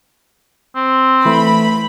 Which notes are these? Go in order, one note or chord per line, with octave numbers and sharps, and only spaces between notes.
C4
E3 A3 B5